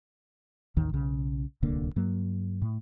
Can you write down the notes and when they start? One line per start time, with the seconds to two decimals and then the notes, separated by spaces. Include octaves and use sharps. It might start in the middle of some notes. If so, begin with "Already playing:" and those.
0.77 A1 D#2 D#3
0.93 B1 C#3
1.62 D1 C2 D3 A#3
1.96 G2 F#3 A#3
2.62 A2